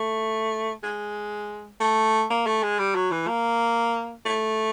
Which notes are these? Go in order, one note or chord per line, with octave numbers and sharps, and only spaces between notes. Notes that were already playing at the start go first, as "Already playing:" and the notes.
Already playing: A3
G#3
A3
A#3
A3
G#3
G3
F#3
E3
A#3
A3